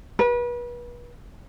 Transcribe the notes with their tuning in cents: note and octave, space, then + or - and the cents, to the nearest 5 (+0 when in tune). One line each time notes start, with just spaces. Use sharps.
B4 -35